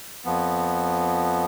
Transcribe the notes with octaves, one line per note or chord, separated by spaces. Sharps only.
F2 F3 B3